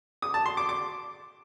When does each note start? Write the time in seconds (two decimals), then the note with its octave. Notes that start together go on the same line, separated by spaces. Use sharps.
0.22 D#6
0.34 A5
0.46 C6
0.57 D6
0.69 D6